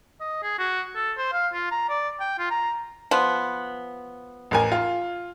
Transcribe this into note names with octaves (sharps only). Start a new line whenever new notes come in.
D#5
G#4
F#4
A4
C5
F5
F4
A#5
D5
G5
F4
A#5
F3 B3
A1 A#4 G#5
F4